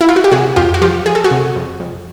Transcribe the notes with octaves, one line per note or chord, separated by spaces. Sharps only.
E4
F4
F#4
G4
C3 F#4 G#4
F2 F4 G4
F#4
F3 F4 G4
F3 G#4
A4
F#4 G#4
C3
F2
F2